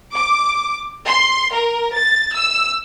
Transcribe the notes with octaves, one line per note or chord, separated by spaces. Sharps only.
D6
C6
A#4
A6
E6